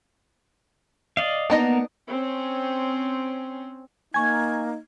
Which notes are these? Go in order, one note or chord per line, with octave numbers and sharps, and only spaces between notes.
D5 D#5 F5
A#3 B3 D4 D#4 A#4 D#5
C4 C#4
A#3 D#4 G#5 C#6 G#6